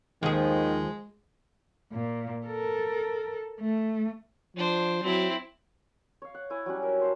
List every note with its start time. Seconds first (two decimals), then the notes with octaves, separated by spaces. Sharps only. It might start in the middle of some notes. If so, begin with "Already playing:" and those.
0.23 D#2 D#3 F3 G#3 G#4
1.93 A#2
2.46 A4 A#4
3.60 A3
4.57 F3 D4 C5
5.03 F#3 C4 E4
6.22 C#5 F5
6.34 F#5
6.50 E4 C#5 G#5
6.66 F#3 G3 C#4 F#5
6.83 A#4 E5
7.00 A#4 C5 F5 A5